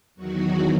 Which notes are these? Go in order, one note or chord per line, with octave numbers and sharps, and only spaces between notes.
E2 D#3 F#3 F#4